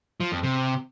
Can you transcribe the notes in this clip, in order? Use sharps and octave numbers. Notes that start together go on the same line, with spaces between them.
F3
F2
C3